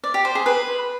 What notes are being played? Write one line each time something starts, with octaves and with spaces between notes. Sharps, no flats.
D5
G4
C5
G#4
B4